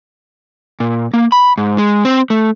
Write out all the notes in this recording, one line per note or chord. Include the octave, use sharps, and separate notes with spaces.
A#2
A#3
B5
G#2
G#3
C4
A3